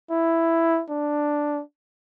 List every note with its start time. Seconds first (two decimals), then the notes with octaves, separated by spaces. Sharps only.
0.10 E4
0.90 D4